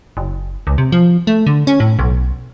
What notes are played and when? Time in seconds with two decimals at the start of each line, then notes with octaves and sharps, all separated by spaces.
0.17 F#1
0.67 C#2
0.78 C3
0.92 F3
1.27 A3
1.46 D3
1.67 C#4
1.80 A2
1.99 B1